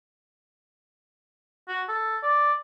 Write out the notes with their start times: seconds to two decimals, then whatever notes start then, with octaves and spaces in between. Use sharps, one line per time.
1.68 F#4
1.89 A4
2.23 D5